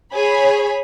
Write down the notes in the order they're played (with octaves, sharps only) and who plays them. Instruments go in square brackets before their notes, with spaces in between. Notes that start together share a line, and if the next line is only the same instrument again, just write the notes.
[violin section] G#4 C#5 B5